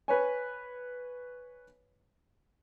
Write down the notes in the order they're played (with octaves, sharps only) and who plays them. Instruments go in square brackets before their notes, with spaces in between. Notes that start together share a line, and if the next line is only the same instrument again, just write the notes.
[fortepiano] B4 C#5 G#5